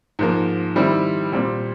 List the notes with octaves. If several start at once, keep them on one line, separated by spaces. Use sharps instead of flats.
G#2 F3 A#3
D#3 G3 C4 E4
A#2 G3 C4